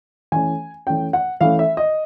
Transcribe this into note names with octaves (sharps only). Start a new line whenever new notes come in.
E3 A3 C#4 G#5
E3 A3 C#4 G5
F#5
E3 A3 C#4 F5
E5
D#5